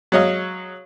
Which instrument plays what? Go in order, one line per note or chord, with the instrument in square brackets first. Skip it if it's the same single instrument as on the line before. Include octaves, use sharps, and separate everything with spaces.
[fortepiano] F#3 G#3 C#5 D#5 F5